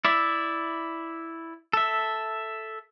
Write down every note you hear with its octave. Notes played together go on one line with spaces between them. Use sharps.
E4 D5 E5
A4 E5